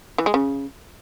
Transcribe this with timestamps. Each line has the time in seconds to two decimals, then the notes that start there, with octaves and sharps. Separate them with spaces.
0.18 E3
0.26 G#3
0.34 C#3